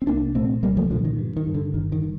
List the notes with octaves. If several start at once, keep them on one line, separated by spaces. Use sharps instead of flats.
C4
C2 A#3 D4
A#2 A3 C4
C2 G3 A#3
F3 A3
A#2 D3 F3
D#3
G2
D#3
G2
D3
G1 D#3
D#3